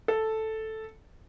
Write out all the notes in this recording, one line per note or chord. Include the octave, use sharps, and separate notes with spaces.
A4